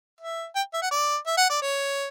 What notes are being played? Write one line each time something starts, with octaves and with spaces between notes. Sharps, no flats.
E5
G5
E5
F#5
D5
E5
F#5
D5
C#5